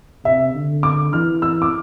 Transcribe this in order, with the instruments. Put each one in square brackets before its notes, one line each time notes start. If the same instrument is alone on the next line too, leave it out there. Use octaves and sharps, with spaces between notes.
[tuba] C3 [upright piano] E5
[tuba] D3
[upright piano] D6
[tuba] E3 [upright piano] F6
[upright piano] E6
D6